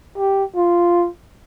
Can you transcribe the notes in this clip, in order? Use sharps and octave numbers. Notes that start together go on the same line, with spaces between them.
G4
F4